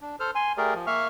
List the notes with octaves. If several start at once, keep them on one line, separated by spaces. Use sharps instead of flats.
D4
A4 C5 F6
G#5 C6
A3 G4 G#4 A#4 D5
F3
A#3 E5 F5 C#6 F6